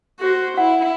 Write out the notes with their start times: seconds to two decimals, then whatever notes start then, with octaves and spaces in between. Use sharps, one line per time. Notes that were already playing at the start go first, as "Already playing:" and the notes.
0.20 F#4 C5
0.58 E4 F#5